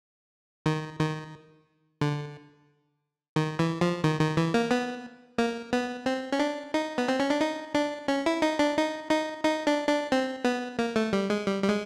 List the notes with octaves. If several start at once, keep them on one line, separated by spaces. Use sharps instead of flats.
D#3
D#3
D3
D#3
E3
F3
D#3
D#3
E3
A#3
B3
A#3
B3
C4
C#4
D4
D#4
B3
C4
C#4
D4
D#4
D4
C#4
E4
D#4
D4
D#4
D#4
D#4
D4
D4
C4
B3
A#3
A3
G3
G#3
G3
G3
G#3